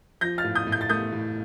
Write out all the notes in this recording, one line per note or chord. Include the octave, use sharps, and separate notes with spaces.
F3 G6 A#6
F6 A6
A2
D#6 G6
A2
G6
A6
A3 D#6 G6
A2